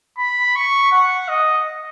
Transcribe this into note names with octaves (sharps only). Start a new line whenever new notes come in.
B5
C#6
F#5
D#5